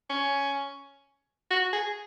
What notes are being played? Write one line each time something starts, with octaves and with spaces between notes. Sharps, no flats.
C#4
F#4
G#4